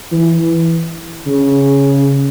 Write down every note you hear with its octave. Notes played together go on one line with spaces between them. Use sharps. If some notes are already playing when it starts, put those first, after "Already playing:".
E3
C#3